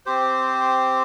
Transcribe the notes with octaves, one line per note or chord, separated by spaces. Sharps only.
C4 G4 C5